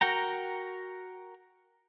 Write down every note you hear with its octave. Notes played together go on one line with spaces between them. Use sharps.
F#4 A#4 F#5 G5 A#5